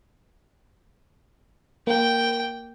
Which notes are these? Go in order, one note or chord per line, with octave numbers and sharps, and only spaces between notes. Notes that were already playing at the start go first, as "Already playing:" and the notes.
A#3 G5